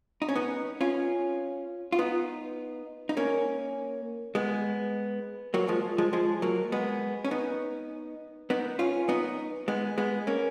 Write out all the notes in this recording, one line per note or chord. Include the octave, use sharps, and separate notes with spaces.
D#4
C#4
B3 D#4
C#4 F4
F4
B3 D#4
D#4
A#3 C#4
G#3 B3
F#3 A#3
F3 G#3
F3 G#3
F3 G#3
F#3 A#3
G#3 B3
C#4
B3 D#4
B3 D#4
C#4 F4
B3 D#4
G#3 B3
G#3 B3
A#3 C#4